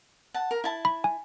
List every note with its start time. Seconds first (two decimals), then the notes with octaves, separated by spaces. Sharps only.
0.34 F#5 A5
0.51 A#4
0.64 E4 A5
0.85 B5
1.04 G#5